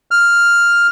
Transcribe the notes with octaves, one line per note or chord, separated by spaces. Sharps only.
F6